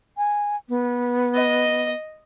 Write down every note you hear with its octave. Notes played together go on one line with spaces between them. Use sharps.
G#5
B3
D#5